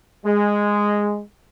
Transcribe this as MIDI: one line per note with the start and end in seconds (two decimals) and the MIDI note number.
0.25 1.20 56